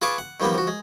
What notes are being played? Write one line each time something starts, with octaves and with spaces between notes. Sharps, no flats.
F4 G#4 B4 A5 C#6 D6
F#5
D#3 F3 G3 A#3 B3
F3 F#4
G#3